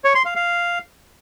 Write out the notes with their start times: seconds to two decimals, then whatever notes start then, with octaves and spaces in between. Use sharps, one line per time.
0.05 C#5
0.15 C6
0.25 F5
0.36 F5